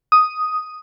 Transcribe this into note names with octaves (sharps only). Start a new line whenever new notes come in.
D#6